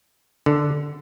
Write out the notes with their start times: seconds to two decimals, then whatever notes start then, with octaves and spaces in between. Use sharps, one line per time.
0.46 D3